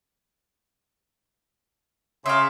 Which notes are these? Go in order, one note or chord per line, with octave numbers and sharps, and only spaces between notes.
C#3 E5 F5 C6